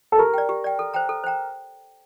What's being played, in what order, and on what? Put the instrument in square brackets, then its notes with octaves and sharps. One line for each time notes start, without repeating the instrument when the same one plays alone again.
[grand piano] A4
[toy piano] G4 [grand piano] A#4
[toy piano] D5 G5
G4
D5 G5
A4
C5 G5 A#5
A4
C5 G5 A#5